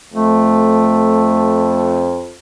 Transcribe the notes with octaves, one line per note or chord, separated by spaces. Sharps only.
F2 A3